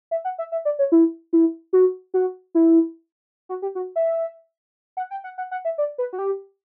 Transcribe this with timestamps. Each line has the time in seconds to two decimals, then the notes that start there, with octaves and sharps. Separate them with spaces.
0.11 E5
0.25 F#5
0.38 E5
0.52 E5
0.65 D5
0.79 C#5
0.92 E4
1.33 E4
1.73 F#4
2.14 F#4
2.55 E4
3.49 F#4
3.62 G4
3.75 F#4
3.96 E5
4.97 F#5
5.11 G5
5.24 F#5
5.38 F#5
5.51 F#5
5.65 E5
5.78 D5
5.98 B4
6.13 F#4
6.19 G4